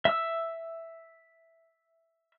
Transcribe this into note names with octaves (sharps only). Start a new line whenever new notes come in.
E5 E6